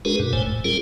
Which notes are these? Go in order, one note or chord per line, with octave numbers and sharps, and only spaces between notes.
G#3 D4 F#4 G#4 A#4 B4
G2 B2
F#1 F2 A2 A3 C5 G#5
A2
G3 C#4 F4 G#4 A#4